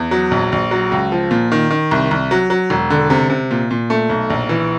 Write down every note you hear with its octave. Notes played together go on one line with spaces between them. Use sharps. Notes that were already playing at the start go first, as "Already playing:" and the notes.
Already playing: E2
F#3
A#1
A#1
F#3
C#2
F3
A#2
D#3
D#3
C2
C2
F#3
F#3
E1
D3
C3
C3
A#2
A#2
A3
B1
A#1
E3